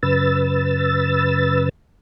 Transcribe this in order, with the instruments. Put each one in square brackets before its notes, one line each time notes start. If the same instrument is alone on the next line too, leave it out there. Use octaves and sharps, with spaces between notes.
[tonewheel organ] F#2 C#3 B4 E6 A6